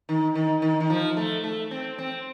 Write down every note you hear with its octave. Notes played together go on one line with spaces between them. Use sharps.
D#3
D#3
D#3
D#3
F3
A3
A3
C4
C4